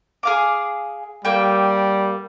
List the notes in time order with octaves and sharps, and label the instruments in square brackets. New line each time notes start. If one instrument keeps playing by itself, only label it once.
[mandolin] G#4 F5 D6
[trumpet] G3 [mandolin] A#3 G5